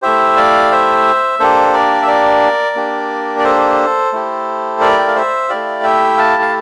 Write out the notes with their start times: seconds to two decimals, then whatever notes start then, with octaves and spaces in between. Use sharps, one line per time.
0.02 A3 E4 G4 C5 E5
0.36 D5 F5
0.71 C5 E5
1.39 A#3 D4 G4 A4 C5
1.74 A#4 D5
2.02 E5
2.08 A#4 D5
2.76 A#3 D4 G4
3.39 D5
3.44 A4 C5
4.12 A3 E4 G4
4.81 A#4 D5
4.99 G5
5.08 F5
5.15 C5 E5
5.49 A3 E4 G4 D5 F5
5.83 E5 G5
6.17 F5 A5
6.42 F5